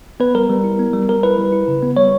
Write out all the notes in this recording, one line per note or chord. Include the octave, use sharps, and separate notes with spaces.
B3 B4
G3 A#4
G3
E4
B3
G3
G3 A#4
E4 B4
G3
E4
C#3
B3
G3 C#5